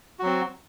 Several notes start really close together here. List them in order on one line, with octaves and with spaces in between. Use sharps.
F#4 F#3 C4